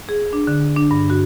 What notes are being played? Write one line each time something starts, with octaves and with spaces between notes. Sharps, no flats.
G#4
D4
D3
D4
G2
F#4